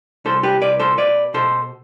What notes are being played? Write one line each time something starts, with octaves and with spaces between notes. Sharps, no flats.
C2 A4 C5
G4 B4
C2 B4 D5
A4 C5
B2 B4 D5
B2 A4 C5